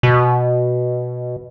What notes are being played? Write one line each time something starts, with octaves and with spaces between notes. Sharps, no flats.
B2